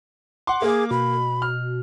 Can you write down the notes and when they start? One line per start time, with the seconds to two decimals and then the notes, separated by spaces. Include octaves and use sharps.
0.47 F#5 C6 D6
0.62 A#3 G#4
0.91 B2 B5
1.42 F6